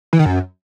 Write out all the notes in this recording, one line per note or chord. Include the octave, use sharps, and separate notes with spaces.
E3
D#3
F#2